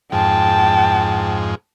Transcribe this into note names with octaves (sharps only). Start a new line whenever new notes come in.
F2 G#2 G5 A5